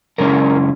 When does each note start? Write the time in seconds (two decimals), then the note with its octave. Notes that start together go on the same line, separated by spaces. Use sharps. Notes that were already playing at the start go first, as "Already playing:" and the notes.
0.18 F#2 C#3 G#3 C#4 E4 A#4